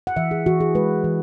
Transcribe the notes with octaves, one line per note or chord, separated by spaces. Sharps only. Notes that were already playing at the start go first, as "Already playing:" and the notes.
F#5
E3 E5
G#4
E3 F#4
G#4
G#3 B4
E3